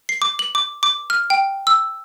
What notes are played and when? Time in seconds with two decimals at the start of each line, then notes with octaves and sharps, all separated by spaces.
0.09 C7
0.22 D6
0.39 F#7
0.55 D6
0.83 D6
1.10 F6
1.30 G5
1.67 E6